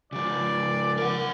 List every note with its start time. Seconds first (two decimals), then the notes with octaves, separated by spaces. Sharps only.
0.13 C#3 F3 D5
0.97 A#4 F#5